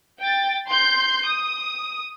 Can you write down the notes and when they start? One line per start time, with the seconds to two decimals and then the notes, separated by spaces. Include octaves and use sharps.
0.20 G5 A6
0.68 C6 G6
1.26 D#6